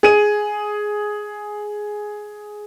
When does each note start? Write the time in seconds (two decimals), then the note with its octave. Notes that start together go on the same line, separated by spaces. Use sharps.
0.03 G#4 D#7